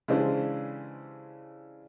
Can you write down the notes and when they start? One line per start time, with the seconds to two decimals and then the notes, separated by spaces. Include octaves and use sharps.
0.08 C#3 E3 G#3 D4 G4 C5